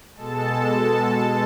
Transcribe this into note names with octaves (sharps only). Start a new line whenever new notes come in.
B2 G#3 A4 A5